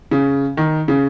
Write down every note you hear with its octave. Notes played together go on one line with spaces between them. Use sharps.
C#3
D#3
C#3